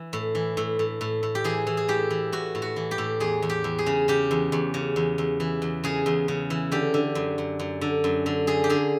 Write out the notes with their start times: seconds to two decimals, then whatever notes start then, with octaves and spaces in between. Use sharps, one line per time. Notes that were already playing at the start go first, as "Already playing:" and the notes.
Already playing: E3
0.13 A2
0.35 E3
0.57 A2
0.79 A2
1.01 A2
1.23 A2
1.35 G4
1.44 E3 G#4
1.67 E3
1.77 G#4
1.88 A2 G4
2.10 E3
2.32 A2 F#4
2.55 A2
2.62 F#4
2.76 E3
2.91 G4
2.98 A2
3.20 E2 G#4
3.42 E2
3.50 G4
3.64 E2
3.78 G#4
3.86 C#3
4.08 C#3 G4
4.31 E2
4.52 E2
4.74 C#3
4.96 E2
5.18 E2
5.40 E3
5.62 E2
5.84 C#3 G#4
6.06 E2
6.28 C#3
6.50 E3
6.72 D3 G4
6.94 D3
7.15 F#2
7.38 F#2
7.59 F#2
7.81 D3
8.04 F#2
8.26 D3
8.47 D3 G#4
8.64 G4
8.70 D3 G#4